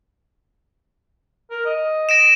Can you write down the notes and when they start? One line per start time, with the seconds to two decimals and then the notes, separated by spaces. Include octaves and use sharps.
1.51 A#4
1.65 D#5
2.09 A#6 D7 E7